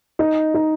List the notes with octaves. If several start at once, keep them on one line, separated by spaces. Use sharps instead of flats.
D#4
D#4